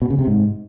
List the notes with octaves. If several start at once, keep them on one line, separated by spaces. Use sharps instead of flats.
B2
C#3
C3
G#2